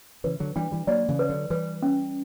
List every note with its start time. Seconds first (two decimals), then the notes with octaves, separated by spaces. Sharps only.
0.24 C#3 E3 B4
0.40 D3 F#3
0.56 E3 G3 D4
0.71 E3 G3
0.87 F#3 A#3 D5
1.08 C#3 E3
1.19 B4
1.29 D3 F#3
1.50 E3 G3 B4
1.83 C#4